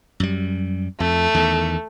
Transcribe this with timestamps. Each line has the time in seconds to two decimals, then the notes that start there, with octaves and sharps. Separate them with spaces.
0.20 F#2 G3
1.00 F2 A3
1.34 E2 D#3